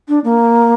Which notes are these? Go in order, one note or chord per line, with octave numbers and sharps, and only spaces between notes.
D4
A#3